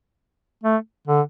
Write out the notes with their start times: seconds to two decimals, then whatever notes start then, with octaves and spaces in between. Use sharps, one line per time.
0.64 A3
1.08 D3